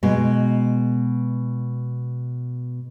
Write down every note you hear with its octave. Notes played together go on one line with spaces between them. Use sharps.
B2 G#3